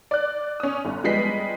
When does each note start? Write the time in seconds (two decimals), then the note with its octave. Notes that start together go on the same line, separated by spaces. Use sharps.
0.11 D5 F#6
0.60 C#4 D#6
0.85 G1
1.04 F3 G3 G#3 B3 B6 C7